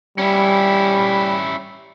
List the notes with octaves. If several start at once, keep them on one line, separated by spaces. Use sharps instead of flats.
G3 C#4 E4